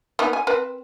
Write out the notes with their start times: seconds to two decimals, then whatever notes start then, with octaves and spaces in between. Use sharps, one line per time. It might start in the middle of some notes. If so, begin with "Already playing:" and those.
0.19 A#3 B3 D#4
0.33 G#5
0.47 C4 A#4 B4